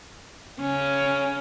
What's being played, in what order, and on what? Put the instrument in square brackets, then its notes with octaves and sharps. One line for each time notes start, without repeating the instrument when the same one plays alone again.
[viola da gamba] C#3 C#4